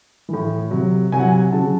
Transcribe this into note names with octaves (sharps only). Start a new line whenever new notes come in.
A2 E3
C3 F#3
C3 F#3 G#5
F#5
G#5
C#3 F#3 A5